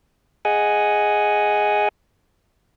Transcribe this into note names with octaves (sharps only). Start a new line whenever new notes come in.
G#4 D#5 F#5 G#5